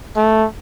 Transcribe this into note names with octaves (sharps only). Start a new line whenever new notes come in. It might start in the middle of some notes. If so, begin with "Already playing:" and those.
A3